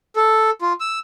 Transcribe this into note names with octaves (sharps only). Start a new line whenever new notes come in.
A4
F4
E6